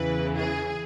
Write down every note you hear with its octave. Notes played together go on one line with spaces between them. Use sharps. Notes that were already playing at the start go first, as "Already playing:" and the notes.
Already playing: E2 C#3 E3 B4
G#4